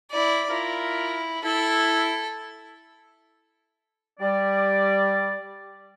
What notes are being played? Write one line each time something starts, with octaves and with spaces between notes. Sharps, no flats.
E4 D5
E4 F4 A#4
E4 A4
G3 D5